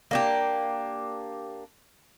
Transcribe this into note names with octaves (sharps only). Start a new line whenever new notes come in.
A#3 D4 G4